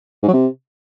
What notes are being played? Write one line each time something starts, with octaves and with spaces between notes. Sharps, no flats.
G#2
F#3
C3